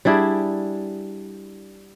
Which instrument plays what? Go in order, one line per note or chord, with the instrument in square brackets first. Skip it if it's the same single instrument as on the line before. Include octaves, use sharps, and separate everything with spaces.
[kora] G3 D4 E4 G#4